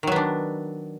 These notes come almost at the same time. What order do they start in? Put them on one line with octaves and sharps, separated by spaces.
D#3 F#3 B3 D4